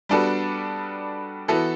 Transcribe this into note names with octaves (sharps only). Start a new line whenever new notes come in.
G3 B3 D4 F#4 A4
E3 B3 F#4 A4